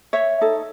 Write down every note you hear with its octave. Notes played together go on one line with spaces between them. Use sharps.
C#5 E5
D#4 A4